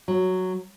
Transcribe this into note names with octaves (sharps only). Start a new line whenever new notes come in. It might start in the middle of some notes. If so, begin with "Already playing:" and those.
F#3